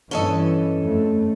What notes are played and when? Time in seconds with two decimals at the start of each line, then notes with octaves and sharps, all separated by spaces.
0.11 G2 E3 C#4 A4 D#5
0.80 F2 A3